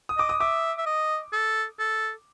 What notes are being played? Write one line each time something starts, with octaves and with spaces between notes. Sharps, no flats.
D#6
D#5 D6
D#6
E5 D6
E5
D#5
A4
A4